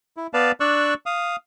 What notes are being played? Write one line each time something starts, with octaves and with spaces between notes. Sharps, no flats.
E4
B3 B4 D5 F5 A5
D4 D5 C#6 E6 F#6
F5 D#6